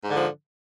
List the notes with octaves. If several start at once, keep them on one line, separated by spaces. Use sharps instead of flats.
G#2 D3 F3